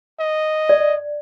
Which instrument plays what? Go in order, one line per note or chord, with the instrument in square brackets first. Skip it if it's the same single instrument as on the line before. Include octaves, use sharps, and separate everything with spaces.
[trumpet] D#5
[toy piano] D5